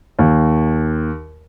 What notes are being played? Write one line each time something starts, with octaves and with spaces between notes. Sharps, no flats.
D#2